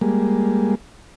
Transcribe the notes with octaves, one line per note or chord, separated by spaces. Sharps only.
G3 G#3 A#3